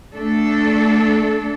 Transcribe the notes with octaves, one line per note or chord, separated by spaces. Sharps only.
A3 D4 A4